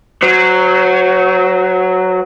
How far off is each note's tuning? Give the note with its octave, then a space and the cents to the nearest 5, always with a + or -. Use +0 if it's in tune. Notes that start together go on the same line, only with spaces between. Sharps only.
F#3 +0 C5 -25